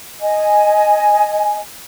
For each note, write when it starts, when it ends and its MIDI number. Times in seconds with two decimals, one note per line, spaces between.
0.21 1.58 75
0.21 1.58 80